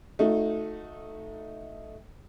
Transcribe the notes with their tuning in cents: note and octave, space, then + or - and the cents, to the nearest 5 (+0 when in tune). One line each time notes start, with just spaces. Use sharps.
A3 +0 D#4 +0 F#4 -40